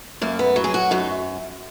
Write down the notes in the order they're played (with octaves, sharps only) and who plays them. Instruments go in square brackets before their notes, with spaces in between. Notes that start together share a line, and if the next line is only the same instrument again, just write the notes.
[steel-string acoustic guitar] F#2 A#3
B3
F#3
G#4
F#4
F#2 D#4